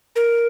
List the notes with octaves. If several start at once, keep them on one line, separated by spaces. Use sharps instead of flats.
A#4